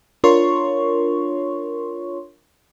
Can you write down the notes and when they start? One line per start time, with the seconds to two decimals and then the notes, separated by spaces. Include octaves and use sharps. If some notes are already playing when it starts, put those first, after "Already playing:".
0.24 D4 F4 A#4 C#5 C6 C#6